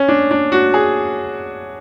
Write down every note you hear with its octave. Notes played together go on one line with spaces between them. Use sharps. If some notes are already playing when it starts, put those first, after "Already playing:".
Already playing: C#4
D4
D4
F#4
G#4